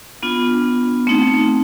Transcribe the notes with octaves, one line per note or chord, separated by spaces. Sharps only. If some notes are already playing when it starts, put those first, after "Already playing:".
B3 D4 F4
A3 C4 D#4